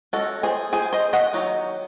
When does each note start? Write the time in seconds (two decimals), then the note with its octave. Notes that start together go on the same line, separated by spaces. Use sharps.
0.13 G#3 C#4 F#4 A4
0.43 G#4 C5
0.73 G#4 C5
0.93 C5 D#5
1.13 D#5 F#5
1.33 D#3 F#3